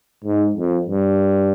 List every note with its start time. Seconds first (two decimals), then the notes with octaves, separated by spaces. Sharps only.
0.25 G#2
0.56 F2
0.87 G2